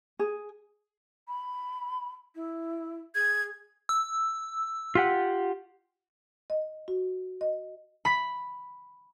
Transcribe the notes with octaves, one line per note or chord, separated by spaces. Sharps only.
G#4
B5
E4
G#4 G#6
E6
F4 G4 F#5
D#5
F#4
D#5
B5 B6